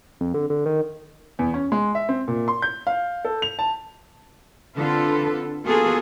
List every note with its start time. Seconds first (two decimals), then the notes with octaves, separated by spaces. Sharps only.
0.21 F2
0.34 D3
0.50 D3
0.66 D#3
1.39 E2
1.54 C#4
1.72 G#3
1.95 E5
2.09 C4
2.28 A#2
2.48 C6
2.62 G6
2.87 F5
3.25 A4
3.42 F7
3.59 A5
4.76 D3 C4 F4 A4 B4
5.64 A#3 B3 F4 F#4 G#4 A4